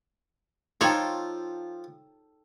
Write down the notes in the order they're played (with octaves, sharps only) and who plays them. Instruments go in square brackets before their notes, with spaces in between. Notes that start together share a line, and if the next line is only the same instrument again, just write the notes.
[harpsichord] F3 F4 [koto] D#4 C#5 [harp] A4 G5